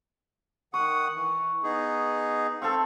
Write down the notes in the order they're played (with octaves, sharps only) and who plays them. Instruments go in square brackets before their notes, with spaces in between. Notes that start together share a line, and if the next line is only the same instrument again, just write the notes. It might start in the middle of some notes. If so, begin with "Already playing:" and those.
[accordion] D#3 F#5 D#6 [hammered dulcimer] C#6
[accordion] E3
B3 D#4 G#4
[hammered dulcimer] C4 A4 [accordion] F5 C#6